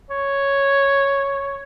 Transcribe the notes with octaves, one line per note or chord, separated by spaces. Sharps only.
C#5